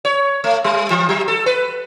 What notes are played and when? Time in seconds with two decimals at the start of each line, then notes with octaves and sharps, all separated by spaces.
0.05 C#5
0.44 A3
0.64 G3
0.90 E3
1.09 F#3
1.28 A4
1.46 B4